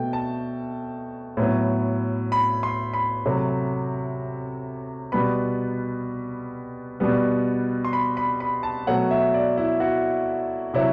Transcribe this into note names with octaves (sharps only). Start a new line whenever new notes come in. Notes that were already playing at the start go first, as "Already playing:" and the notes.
Already playing: B2 A3 G5
A5
A2 F#3 B3
B5
C6
B5
C3 F#3 A3
B2 G3 B3 B5
B2 G3 B3
C6
B5
B5
B5
A5
B2 F#3 A3 F#5
E5
D5
E4
F#4
C3 F#3 E4